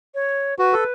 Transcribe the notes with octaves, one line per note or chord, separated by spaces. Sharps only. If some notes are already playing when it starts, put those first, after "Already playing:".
C#5
F#4 B4
A4